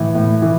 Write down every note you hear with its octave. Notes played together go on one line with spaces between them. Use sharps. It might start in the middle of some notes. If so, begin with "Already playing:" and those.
Already playing: A2 E3
A2
E3